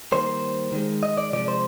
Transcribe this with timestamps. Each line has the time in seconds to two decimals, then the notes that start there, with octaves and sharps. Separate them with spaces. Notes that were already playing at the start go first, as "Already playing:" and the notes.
0.12 D#3 G3 A#3 C5
0.72 D#3 G#3
1.03 D#5
1.17 D5
1.33 C3 F3 G#3 D5
1.48 C5